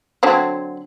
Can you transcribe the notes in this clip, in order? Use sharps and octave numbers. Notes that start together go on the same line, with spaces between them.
D3 F#3 C4